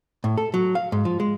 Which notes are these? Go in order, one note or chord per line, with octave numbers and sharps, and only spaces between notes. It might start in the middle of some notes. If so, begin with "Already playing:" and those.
A2
A4
F#3
F5
G#2
F3
G#3